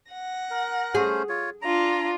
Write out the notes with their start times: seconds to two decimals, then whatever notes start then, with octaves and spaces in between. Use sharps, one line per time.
0.11 F#5 A#6
0.50 A#4
0.95 A3 C#4 G#4 C5
1.29 F4 C#5
1.62 D4 F4 A#5